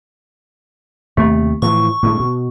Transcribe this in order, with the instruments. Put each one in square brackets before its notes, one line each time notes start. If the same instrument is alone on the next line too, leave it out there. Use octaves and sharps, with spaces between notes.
[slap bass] D#2 C3 [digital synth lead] A3
[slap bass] A2 E3 F3 [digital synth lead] C#6
[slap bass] A2 D3 G#3
B2